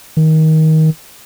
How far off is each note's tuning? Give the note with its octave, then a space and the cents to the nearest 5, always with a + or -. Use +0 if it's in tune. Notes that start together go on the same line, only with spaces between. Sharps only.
D#3 +20